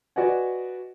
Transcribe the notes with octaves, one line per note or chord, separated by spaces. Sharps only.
F#4 B4 D5 D#5 F#5 G#5